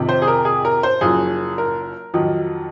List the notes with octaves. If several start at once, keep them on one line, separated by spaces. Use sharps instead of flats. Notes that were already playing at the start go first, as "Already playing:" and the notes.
Already playing: F2 C3 D#3
C5
G#4
A#4
G#4
A#4
C5
F#1 F#2 F3 G#4
A#4
F2 D#3 F#3